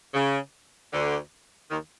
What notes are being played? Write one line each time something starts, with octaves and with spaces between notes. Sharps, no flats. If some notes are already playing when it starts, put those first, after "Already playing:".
C#3
D2 D3
D#2 D#3